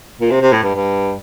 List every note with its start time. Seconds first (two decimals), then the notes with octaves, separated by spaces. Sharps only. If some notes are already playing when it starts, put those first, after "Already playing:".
0.21 A#2
0.30 C3
0.41 C3
0.52 A2
0.63 G2
0.75 G2